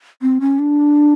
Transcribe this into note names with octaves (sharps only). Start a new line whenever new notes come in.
C4
C#4
D4